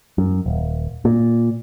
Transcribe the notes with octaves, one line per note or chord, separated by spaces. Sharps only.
F#2
D#1
A#2